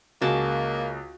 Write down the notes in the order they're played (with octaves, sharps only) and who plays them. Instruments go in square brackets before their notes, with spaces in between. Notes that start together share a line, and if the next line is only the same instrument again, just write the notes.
[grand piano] C#2 G#4 [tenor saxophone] A#3 [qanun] F#4 A5